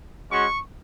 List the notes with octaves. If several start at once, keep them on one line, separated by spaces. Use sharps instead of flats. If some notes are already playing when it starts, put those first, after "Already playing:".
G#3 C#4 F#4 C#6